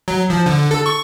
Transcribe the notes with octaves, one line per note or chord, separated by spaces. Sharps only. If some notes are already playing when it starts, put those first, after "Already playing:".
F#3
F3
D3
A4
C#6